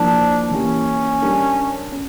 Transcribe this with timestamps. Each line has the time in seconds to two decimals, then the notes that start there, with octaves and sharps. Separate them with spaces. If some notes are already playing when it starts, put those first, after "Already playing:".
Already playing: F3 A#3 D4 E4 A#4
0.51 E3 A#3 C#4 E4 G4
1.22 G3 D4 G4 A#4
1.92 C#4